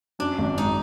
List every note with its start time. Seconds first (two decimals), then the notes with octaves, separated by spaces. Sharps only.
0.19 F#2 D4
0.38 G#1
0.58 G#3 D#4